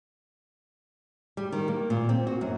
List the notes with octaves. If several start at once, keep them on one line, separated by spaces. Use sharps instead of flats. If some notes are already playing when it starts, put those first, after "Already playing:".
G3
D#3
A#3
A#2
C4
F#4
F#2